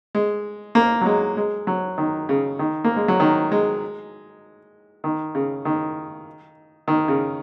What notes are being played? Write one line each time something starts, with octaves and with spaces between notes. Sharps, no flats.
G#3
A#3
F#3
G#3
G#3
F#3
D#3
C#3
D#3
A#3
G#3
F#3
D#3
G#3
D#3
C#3
D#3
D#3
C#3